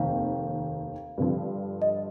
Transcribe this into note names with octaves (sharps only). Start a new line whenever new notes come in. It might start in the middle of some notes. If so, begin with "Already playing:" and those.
Already playing: F1 D#2 D#3 F5
G2 D3 F3
D#5